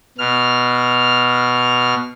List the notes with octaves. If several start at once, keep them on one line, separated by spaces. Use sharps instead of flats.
B2 F6